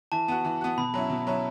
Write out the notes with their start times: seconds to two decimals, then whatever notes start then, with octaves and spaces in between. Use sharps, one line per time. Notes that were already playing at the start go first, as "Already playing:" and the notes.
0.12 E3 A5
0.28 B3 F#4
0.45 E3
0.61 B3 F#4
0.78 B2 B5
0.94 F#3 C#4 E4
1.10 B2
1.27 F#3 C#4 E4